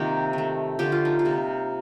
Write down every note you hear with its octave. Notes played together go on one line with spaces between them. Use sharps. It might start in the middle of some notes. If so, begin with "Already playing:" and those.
Already playing: C3 D#3 A#3 F4 G4
D#3 A3
D3 F3 A3 G4
F4
D#4
F4
C3 G3 A#3